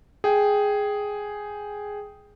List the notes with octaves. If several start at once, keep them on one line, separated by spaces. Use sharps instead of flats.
G#4 G5